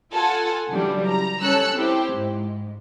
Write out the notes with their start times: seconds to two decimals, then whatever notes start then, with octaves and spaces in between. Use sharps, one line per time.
0.13 F4 A4 F#5 G#5
0.71 C#3 E3 F#3 G3 D4
1.08 A#5
1.43 G3 C#4 A4 E6 F#6 C#7
1.75 C4 E4 G4 C5
2.13 G#2